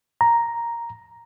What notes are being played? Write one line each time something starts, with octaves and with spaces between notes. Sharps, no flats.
A#5